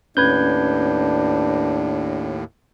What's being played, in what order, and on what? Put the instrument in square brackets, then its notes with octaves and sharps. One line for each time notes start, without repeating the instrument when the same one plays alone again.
[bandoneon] D#2 A2 [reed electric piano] C#4 G#6 [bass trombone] D4 [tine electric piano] B4 G6